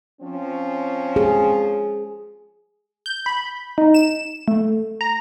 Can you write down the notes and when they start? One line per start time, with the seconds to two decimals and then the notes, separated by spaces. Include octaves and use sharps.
0.22 F3 C4 C#4
1.16 G#4
3.06 G6
3.26 B5
3.78 D#4
3.94 E7
4.48 A3
5.01 A#5